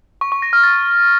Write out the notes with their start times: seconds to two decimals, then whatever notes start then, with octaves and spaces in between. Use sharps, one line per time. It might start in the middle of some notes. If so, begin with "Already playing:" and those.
0.21 C#6
0.32 C#6
0.42 A#6
0.53 F6
0.63 A6